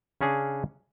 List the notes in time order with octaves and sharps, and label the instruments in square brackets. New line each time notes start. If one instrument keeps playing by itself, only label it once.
[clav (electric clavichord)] C#3 C#4 D4 G#4